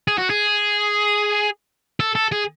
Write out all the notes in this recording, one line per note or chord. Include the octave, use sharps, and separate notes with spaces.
G#4
F#4
G#4
A4
A4
G#4